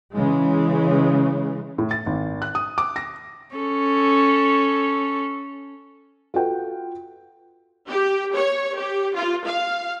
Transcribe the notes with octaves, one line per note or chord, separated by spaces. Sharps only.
C#3 E3 G#3
A2
A6
G#1
F#6
D#6
D6
A#6
C#4 A4
F4 F#4 A4 B4 F#5 G5
G4
C#5
G4
F4
F5